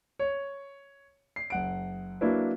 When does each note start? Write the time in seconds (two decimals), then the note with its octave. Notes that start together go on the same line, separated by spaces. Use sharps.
0.19 C#5
1.36 C7
1.50 F#1 F#5 D7
2.21 F#3 A#3 D4 E4 B4